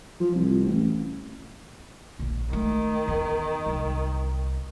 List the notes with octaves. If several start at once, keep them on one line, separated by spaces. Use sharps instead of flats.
F3
C2
A1
A#1 D3
D#3 A3
E2
C2 D3